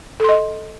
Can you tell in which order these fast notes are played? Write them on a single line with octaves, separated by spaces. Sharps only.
A4 C6 D#5